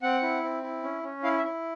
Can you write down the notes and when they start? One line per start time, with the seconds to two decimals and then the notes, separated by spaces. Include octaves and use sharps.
0.02 C4 F#5
0.22 E4
0.43 C4
0.63 E4
0.83 C#4
1.03 C#4
1.24 E4 F5
1.38 E5
1.44 E4